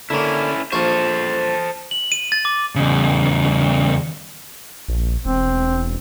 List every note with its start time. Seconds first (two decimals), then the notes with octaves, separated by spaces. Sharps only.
0.10 D3 A#3 C#4 E4
0.72 A#1 A4 C5 F5 C#6
1.91 F#7
2.12 D#7
2.32 A6
2.45 D6
2.76 E2 C#3
4.88 A#1
5.25 E1 C4